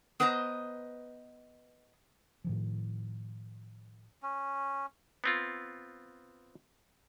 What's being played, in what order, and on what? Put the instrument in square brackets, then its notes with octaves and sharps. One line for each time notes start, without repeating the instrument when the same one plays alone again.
[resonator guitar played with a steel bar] B3 B4 C5 D#5 A#5
[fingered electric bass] A2 D#3 F3
[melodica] C#4
[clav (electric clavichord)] B3 C4 F4